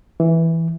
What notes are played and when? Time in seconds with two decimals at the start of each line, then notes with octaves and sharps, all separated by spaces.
0.20 E3